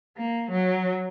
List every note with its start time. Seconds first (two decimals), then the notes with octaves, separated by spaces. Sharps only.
0.17 A#3
0.51 F#3